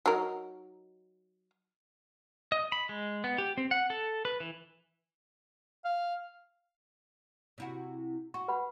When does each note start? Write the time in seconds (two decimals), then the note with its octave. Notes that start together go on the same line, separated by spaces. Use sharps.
0.06 F#3 D#4 A#4
2.52 D#5
2.72 B5
2.89 G#3
3.24 B3
3.38 G4
3.57 C4
3.71 F#5
3.90 A4
4.25 B4
4.40 E3
5.85 F5
7.58 C3 E4 F#4
8.34 F#4 C#6
8.48 B4 F#5 B5